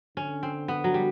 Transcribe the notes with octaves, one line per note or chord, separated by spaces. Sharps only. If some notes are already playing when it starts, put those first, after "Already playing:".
D3 C#4
C4
B3
F#3
G3